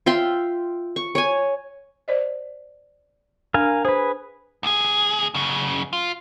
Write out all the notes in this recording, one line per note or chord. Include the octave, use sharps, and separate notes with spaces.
F4 E5 G5 C6
C#6
C#5 G#5
C5 D5 D#5
D4 A#4 F5 G#5
G#4 B4 C5
D2 G#4
F#2 C#3
F4